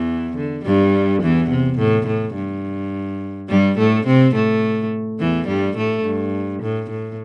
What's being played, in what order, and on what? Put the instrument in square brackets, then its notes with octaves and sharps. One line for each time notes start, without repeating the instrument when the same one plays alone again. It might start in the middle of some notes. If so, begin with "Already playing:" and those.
Already playing: [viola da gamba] E2 E3
D3
G2 G3
E2 E3
C3
A2
A2
G2
G2 G3
A2 A3
C3 C4
A2 A3
E2 E3
G2 G3
A2 A3
G2
A2
A2